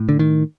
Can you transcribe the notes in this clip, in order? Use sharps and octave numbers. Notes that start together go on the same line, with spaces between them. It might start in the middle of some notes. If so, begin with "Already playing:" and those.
Already playing: A2
D3
D#3